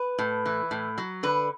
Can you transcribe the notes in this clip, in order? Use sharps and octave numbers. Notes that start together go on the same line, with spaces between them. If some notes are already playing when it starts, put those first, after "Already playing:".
Already playing: B4
A2
E3
A2
F#3
D3 B4